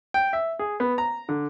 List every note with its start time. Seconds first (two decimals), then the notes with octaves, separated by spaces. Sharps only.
0.14 G5
0.33 E5
0.59 G#4
0.80 B3
0.98 A#5
1.29 D3